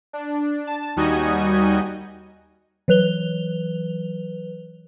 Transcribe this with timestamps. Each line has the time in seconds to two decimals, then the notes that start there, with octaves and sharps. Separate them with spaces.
0.13 D4
0.67 A5
0.96 D#2 G3 D#4 F#4 D#5 G#5
2.88 E3 F#3 B4 F7 G7